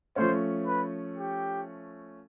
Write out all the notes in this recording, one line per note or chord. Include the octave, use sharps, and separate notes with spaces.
F3 A3 C#4 C5
B4
G4